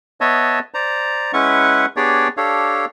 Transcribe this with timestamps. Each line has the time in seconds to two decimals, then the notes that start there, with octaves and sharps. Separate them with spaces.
0.21 B3 C#5 D#5 E5 A5
0.74 C5 D5 A#5
1.33 G#3 C#4 E4 B4 F#5 C#6
1.97 B3 D4 G4 G#4 C#5 D5
2.37 D4 G4 A4 C#5 F5